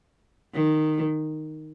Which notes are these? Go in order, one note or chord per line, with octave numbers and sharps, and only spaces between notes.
D#3